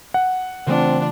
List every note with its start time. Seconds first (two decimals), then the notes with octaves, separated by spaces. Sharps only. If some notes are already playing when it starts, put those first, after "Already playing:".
0.14 F#5
0.67 C#3 E3 A3 C4 D4 F4